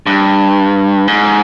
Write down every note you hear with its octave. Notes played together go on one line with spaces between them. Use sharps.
G2
G#2